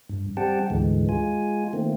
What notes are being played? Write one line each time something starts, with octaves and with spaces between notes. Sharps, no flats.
G2
G3 C4 G4 F#5 G5 A5
D2 G#2 D3 E3 G#3
G#3 F4 G#5
D#3 A3 A#3 C4